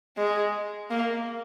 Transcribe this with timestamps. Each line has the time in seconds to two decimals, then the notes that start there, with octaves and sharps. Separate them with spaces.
0.17 G#3
0.91 A#3